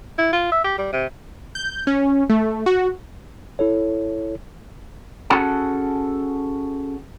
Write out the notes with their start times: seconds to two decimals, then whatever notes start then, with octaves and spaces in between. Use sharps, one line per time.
0.19 E4
0.33 F4
0.52 E5
0.65 G4
0.78 G3
0.93 C3
1.55 G6
1.87 C#4
2.30 A3
2.66 F#4
3.59 E4 A4 C#5
5.30 C#4 F#4 G#4 A4 F#5 A5